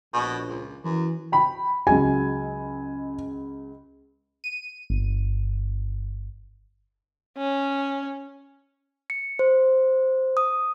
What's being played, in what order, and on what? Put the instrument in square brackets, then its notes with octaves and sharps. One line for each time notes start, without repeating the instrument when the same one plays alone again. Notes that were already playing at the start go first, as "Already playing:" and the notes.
[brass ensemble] A#1 [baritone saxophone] B2
[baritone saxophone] C#2
[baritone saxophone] F#2 [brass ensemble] E3
[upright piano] G5 B5
[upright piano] C#2 F#3 G#3 [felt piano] G#5
[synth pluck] D#7
G1
[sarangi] C#4
[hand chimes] C#7
C5
D#6